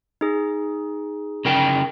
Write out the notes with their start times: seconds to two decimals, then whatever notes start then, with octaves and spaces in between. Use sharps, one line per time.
0.21 D#4 G#4
1.45 C#3 A#4 G5